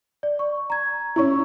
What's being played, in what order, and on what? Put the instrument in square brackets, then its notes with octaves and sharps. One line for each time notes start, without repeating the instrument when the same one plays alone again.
[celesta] D5
C#6
A#5 G#6
[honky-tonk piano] C#4 E4 [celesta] A#5 C#6